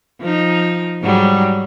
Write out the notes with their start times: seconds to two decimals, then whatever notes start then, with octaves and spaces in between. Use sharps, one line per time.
0.21 F3 D#4
1.03 G#2 F#3 G3